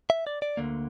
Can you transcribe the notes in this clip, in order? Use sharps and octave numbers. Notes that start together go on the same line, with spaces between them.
E5
D5
D5
D2 D3 A#3